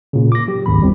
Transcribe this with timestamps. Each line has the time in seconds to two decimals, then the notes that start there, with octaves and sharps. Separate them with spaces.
0.13 A#2 C#3
0.32 D6 A#6
0.48 F#3 G4
0.66 G#1 D2 B5
0.80 G1 E2 G3 C4